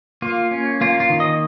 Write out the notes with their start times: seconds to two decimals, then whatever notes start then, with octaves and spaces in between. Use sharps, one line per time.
0.22 A#3 F4
0.51 C#4
0.81 A#3 F4
1.00 F4
1.10 D#3
1.20 D#5